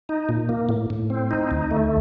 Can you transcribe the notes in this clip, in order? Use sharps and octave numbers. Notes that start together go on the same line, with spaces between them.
D#4
A#2
A#3
A2
A2
C4
D#4
D2
A3